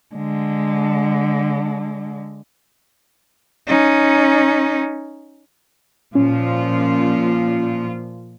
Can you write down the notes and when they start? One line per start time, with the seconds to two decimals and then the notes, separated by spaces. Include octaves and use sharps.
0.15 D3 G#3
3.67 C#4 D#4
6.15 A#2 F3 C#4 F4